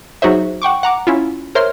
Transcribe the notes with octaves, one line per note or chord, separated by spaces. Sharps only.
F#3 D#4 F#4 G#4 C5 E5
F#5 G5 C#6 D6
F#5 A#5 D6
C#4 E4 F4
A#4 C5 C#5 E5 C6 F6